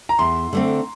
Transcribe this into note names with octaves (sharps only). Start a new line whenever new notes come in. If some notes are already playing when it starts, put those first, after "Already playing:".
A#5
E2 C6
D3 A3 C4